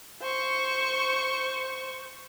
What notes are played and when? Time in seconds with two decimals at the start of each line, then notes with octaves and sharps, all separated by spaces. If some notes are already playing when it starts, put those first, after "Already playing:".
0.21 C5 C#6